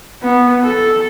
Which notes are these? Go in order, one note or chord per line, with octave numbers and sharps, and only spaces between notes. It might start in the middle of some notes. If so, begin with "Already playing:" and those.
B3
A4